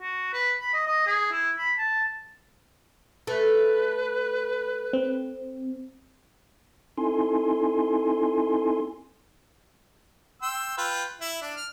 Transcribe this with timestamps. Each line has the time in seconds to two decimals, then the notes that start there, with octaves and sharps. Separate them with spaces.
0.01 F#4
0.33 B4
0.61 B5
0.74 D#5
0.87 D#5
1.07 G#4
1.32 E4
1.59 B5
1.78 A5
3.27 A3 B4
4.93 C4
6.98 C4 D#4 E4 A4 G#5 C6
10.42 G5 C6 E6
10.78 F4 B4 G5
11.21 E4
11.42 D4
11.57 F6